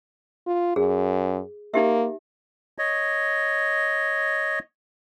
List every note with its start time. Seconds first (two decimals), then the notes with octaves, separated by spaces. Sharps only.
0.47 F4
0.76 F#2 G#4
1.74 A#3 D#4 G4 E5
2.78 C#5 D#5